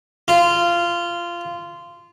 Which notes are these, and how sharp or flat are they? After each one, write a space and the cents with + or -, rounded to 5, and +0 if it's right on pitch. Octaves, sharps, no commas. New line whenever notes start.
F4 -15